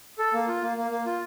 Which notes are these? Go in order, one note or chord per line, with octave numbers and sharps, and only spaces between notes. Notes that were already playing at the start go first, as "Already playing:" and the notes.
A4
A#3
F4
A#3
A#3
A#3
F4